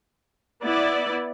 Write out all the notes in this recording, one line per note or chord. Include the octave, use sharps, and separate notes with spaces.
B3 E4 D5